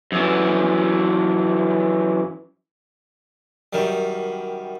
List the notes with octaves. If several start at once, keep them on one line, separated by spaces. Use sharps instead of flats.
F#2 E3
F#2 D#3 G3